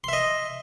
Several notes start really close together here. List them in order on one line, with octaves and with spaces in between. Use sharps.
C6 E5 D#5